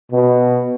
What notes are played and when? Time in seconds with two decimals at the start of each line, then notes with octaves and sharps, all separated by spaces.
0.12 B2